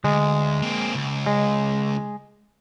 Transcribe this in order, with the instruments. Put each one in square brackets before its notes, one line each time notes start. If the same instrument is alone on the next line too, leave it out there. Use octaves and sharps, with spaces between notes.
[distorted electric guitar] D2 [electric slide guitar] G#3
[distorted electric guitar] A#3 C4
C#2
[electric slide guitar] G#3